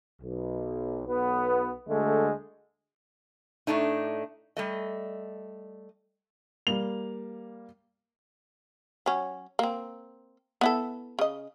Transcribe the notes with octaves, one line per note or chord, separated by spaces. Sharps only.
B1
B1 B3
D2 D3 G#3 A3
A2 A3 D4 D#4
G3 A3 D#5
G3 A#3 F7
F#3 C#4
A#3 C4
B3 E4 A4
C#3 D#5